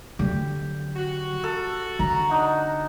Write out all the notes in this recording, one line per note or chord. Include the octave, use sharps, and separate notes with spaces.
D3 F#3 G4
F#4
A4
D3 A#5
D4 D#4 F#5